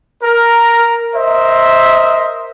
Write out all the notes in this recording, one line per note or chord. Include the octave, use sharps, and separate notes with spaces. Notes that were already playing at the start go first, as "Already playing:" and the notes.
A#4
A#4 C5 D#5 E5